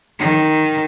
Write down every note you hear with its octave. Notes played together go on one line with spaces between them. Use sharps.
D#3